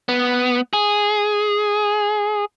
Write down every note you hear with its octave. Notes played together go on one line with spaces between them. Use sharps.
B3
G#4